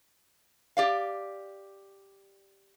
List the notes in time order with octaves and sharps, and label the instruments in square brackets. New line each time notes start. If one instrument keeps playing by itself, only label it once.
[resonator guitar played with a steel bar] G4 D5 F5